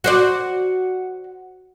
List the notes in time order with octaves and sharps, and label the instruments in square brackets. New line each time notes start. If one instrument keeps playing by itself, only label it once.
[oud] F#4 C5 D5